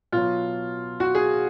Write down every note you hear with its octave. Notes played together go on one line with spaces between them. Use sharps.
B2 F#3 F4
F#4
G#4